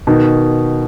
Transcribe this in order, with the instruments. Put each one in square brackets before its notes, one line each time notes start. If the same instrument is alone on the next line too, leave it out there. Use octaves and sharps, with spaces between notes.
[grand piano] B2 D#3